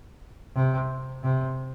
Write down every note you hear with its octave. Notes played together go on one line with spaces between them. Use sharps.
C3
C3